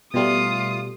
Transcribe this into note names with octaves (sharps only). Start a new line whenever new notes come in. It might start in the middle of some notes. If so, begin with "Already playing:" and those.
B2 G3 A3 F4 D#6